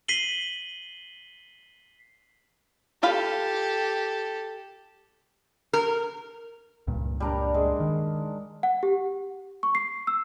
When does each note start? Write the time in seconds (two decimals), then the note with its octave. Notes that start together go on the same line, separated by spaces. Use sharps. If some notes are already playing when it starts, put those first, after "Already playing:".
0.08 B6 C7 D#7 F#7 G7
3.03 F4 G4 A4 F5 B5
5.73 A#4
6.87 C#2 G2 A#2
7.20 G3 D4 A#4
7.54 G#3
7.80 D#3
8.63 F#5
8.83 G4
9.63 C#6
9.75 C7
10.07 E6